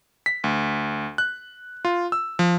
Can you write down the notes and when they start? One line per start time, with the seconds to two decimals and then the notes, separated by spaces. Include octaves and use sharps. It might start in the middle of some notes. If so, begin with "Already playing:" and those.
0.26 B6
0.44 D2
1.18 F#6
1.85 F4
2.12 E6
2.39 F3